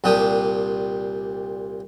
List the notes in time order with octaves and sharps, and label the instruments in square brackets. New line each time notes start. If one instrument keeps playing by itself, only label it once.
[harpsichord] C2 A#2 D4 G4 D#6